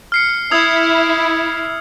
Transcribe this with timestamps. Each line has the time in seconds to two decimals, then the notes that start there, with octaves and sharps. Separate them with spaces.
0.12 F6 C7 C#7
0.51 E4 D#6 E6 G#6